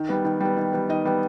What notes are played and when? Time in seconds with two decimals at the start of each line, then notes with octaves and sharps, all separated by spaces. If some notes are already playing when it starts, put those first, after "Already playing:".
Already playing: D#3
0.09 G3 B3
0.24 D#3
0.41 G3 B3
0.57 D#3
0.73 G3 B3
0.89 D#3 D#5
1.05 G3 B3